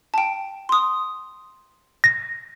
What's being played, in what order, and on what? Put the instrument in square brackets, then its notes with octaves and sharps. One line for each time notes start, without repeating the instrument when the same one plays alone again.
[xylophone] G5 A5
C6 D#6
[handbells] A#6